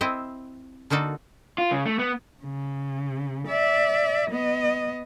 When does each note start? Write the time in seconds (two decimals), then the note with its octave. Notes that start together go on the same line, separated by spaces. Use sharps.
0.01 C4 E4 D#5
0.90 D3 A#3 D#4 F#4 A4
1.58 F4
1.71 C#3
1.86 A3
1.99 B3
2.43 C#3
3.47 D5 E5
4.31 B3 D#5